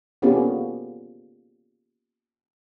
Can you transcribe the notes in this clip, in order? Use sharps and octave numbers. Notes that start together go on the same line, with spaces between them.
A#3 B3 C#4 F4 G4 A4